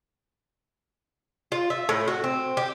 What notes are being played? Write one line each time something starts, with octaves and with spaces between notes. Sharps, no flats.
F4
E5
A2
F#4
C4
G4